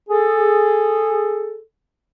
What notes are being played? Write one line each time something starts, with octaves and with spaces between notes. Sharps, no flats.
G#4 A4